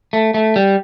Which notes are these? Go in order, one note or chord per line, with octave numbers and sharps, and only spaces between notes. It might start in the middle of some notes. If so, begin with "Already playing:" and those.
A3
A3
G3